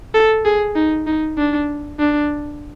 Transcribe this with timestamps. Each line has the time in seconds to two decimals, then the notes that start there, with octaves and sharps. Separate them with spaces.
0.14 A4
0.45 G#4
0.76 D#4
1.07 D#4
1.38 D4
2.00 D4